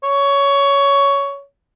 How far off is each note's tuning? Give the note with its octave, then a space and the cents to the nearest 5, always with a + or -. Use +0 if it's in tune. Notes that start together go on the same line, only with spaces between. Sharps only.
C#5 +15